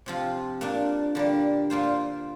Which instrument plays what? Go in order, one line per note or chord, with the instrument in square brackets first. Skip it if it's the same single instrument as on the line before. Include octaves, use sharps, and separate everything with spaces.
[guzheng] C3 F3 C4 F4
A#2 A#3 D4
D3 G3 A#3
A#2 A#3 F4 C5